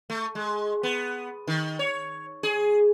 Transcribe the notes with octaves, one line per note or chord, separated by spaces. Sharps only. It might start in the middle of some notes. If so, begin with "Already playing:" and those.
A3
G#3
B3
D#3
C#5
G#4